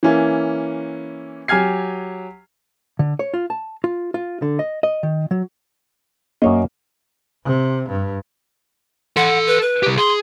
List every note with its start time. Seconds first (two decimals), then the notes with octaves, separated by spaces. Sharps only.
0.03 E3 A#3 C#4 E4
1.48 F#3 G4 G#5 F6 G#6 C7
2.99 D3
3.19 C#5
3.34 F4
3.50 A5
3.84 F4
4.14 F4
4.42 D3
4.59 D#5
4.83 D#5
5.03 D#3
5.31 F#3
6.42 F#2 A#3 C#5 D#5
7.44 C3
7.89 G2
9.17 A4 F#5 C6
9.47 B4
9.61 B4
9.83 C2 G4
9.97 G#4 C6